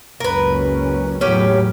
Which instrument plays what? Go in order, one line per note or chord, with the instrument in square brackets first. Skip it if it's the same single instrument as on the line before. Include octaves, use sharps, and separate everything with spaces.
[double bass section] F#1 C#2 C#4 [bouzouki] A#4 B4
[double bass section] E2 A2 F#3 [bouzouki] C#4 G4 A#4